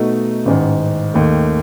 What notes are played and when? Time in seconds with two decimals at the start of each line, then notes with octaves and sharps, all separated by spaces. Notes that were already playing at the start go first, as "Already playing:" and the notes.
Already playing: B2 A3 D#4 F#4
0.45 A1 G#2 D#3
1.14 D#2 D#3 A3